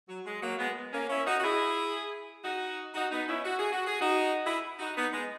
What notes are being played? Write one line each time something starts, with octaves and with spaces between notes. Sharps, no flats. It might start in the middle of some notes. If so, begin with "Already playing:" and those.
F#3
G#3
F#3 A#3
G#3 B3
A#3 C#4
C#4 E4
D#4 F#4
F#4
E4 G#4
D#4 F#4
D#4 F#4
B3 D#4
C#4 E4
F#4
G#4
F#4
G#4
D#4 F#4
E4 G#4
D#4 F#4
B3 D#4
G#3